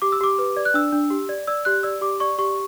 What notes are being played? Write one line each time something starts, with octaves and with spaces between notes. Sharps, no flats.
G4 D6
E6
G4 D6
B4
D5
F#6
D4 E6
D4
G4
D5
D5 E6
G4 F#6
D5 E6
G4 D6
D5 C#6
G4 C#6